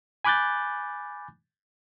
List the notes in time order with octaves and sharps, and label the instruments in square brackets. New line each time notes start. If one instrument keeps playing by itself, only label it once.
[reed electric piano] G#5 B5 D6 F#6 G6 A6